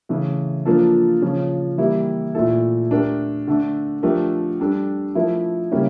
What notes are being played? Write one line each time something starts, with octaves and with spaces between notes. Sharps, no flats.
C#3 E3 A3
F3 A#3 D4 F4 A4
C#3 F3 C#4
E3 G3 A#3 E4 G4
A#2 A3 E4 A4
A3 D4 G4 A#4
D3 A3 D4
F3 A3 D4 G4 A#4
G3 D4 A4
F3 A3 E4 A#4
C#3 G3 A#3 C#4 E4